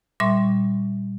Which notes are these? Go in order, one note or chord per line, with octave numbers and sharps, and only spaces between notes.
A#2 G3 E5 C6 C#6